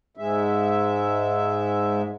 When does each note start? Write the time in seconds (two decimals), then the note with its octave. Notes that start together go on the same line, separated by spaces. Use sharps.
0.17 G#2 G#3 E5